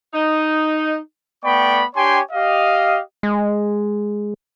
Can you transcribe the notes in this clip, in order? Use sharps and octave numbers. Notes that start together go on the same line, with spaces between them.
D#4
A3 B3 D5 G5 B5 C#6
D4 G4 C#5 G5 G#5 C6
G4 D#5 F5
G#3